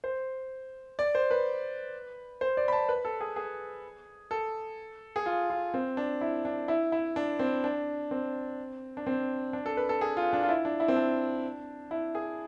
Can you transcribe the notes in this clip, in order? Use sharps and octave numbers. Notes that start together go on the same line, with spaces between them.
C5
D5
C5
B4
C5
D5
B5
A5
B4
A4
G#4
G#4
A4
G#4
F4
F4
C4
D4
E4
D4
E4
E4
D4
C4
D4
C4
D4
C4
D4
A4
B4
A4
G#4
F4
D4
F4
E4
D4
E4
C4
D4
E4
G#4